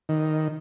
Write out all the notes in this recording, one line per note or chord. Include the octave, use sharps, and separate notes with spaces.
D#3